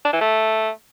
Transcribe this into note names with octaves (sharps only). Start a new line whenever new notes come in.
D4
E3
A3